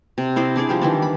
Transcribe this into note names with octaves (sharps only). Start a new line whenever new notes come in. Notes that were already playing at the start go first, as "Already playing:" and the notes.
C3
E4 C5 D5 D#5
D4 G4 G#4 D5
F3 G3 G4
D#3 E3 D4
B5